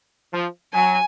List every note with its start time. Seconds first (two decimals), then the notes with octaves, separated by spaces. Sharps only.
0.33 F3
0.73 F#3 G#5